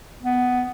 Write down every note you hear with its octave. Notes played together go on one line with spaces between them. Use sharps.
B3